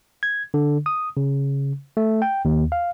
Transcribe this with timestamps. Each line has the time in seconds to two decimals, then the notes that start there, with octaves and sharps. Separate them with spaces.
0.23 G#6
0.54 D3
0.86 D#6
1.17 C#3
1.97 A3
2.22 G5
2.45 D#2
2.72 F5